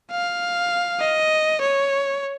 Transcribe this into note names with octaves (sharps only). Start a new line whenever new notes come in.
F5
D#5
C#5